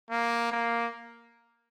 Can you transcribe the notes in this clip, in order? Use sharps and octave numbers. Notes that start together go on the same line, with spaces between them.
A#3
A#3